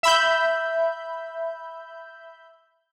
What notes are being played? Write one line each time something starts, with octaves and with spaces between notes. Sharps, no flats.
E5 B5 G6